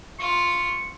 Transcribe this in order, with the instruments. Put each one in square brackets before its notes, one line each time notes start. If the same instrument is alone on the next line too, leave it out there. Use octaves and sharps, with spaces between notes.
[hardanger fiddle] F4 [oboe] C#6